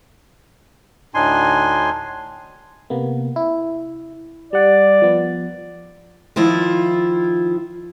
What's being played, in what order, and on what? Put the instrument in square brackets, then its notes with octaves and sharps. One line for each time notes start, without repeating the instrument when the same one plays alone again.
[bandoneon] D2 A2 D4 D#4 G#5 C6
[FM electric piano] C3 A#3 B3
E4
[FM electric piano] G3 F#5 [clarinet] D5
[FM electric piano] F3 B3
[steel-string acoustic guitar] D#3 F3 E4 F4